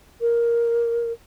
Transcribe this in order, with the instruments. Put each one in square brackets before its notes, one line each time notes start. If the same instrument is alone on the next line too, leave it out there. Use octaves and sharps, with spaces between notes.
[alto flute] A#4